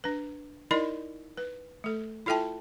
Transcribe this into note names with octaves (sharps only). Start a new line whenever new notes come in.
D4 B4
D#4 E4 A#4 D5 D#5 C6
B4
A3 A4
E4 F4 A4 E5 G5 A5